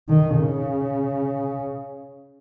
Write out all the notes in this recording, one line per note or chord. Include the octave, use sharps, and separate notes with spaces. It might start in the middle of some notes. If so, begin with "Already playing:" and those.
D#3
C#3